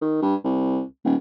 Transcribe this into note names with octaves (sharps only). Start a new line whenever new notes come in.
D#3
G2
C2
D#1